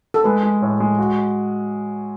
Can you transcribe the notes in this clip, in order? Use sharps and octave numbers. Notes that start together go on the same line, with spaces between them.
A4
G#3 B4
G#3
A2
G#3
F#4